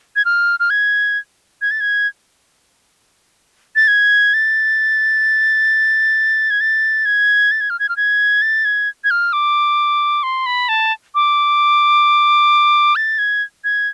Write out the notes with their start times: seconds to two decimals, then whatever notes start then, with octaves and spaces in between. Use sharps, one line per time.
0.16 G#6
0.25 F6
0.60 F6
0.70 G#6
1.62 G#6
1.71 A6
1.80 G#6
3.76 A6
3.88 G#6
4.34 A6
6.50 G#6
6.61 A6
7.05 G#6
7.51 A6
7.61 G#6
7.70 F6
7.79 G#6
7.89 F6
7.97 G#6
8.42 A6
8.65 G#6
9.04 G#6
9.11 F6
9.33 D6
10.23 C6
10.46 B5
10.69 A5
11.15 D6
12.96 A6
13.19 G#6
13.64 G#6